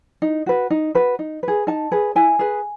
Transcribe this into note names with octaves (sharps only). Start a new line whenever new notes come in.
D#4
F#4 B4
D#4
F#4 B4
D#4
G#4 B4
D#4 A5
G#4 B4
E4 G#5
G#4 B4